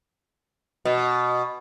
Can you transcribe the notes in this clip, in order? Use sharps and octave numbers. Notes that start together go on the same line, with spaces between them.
B2